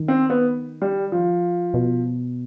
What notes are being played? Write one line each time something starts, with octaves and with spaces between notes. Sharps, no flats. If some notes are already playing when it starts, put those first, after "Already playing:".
Already playing: D#3
C4
B3
G3
F3
B2